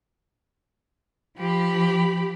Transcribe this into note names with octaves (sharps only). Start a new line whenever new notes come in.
F3 G4 B5